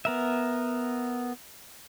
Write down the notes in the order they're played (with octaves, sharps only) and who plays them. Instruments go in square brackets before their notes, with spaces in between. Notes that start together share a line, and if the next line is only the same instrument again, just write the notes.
[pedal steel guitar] B3 A#4 E5